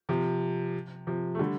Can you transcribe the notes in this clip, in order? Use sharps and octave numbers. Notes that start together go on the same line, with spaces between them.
C3 F3
C3 F3
A3
D3 G3